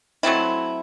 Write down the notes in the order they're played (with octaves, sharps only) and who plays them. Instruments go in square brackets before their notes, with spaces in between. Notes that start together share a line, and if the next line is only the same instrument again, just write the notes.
[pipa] F#3 A3 C4 E4